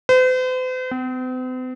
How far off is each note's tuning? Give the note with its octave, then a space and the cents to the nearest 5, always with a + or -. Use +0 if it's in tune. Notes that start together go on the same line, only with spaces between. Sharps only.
C5 -45
C4 -45